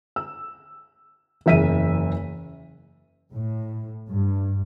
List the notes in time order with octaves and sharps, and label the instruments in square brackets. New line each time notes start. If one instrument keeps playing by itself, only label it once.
[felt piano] E6
F#1 E2 E5 B6 D#7
[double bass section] A2
G2